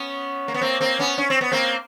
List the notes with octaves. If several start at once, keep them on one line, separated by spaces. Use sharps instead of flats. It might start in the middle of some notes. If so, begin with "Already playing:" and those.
Already playing: B3 C#4
A#3
B3
A#3 C4
A#3 C4
B3 C#4
C#4
C4
B3
A#3 C4